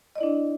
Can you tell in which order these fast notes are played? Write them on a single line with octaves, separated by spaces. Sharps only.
D#5 D5 E4 D4